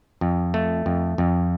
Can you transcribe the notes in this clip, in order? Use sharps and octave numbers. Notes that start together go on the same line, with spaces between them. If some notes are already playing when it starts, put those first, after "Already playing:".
F2
A3
F2
F2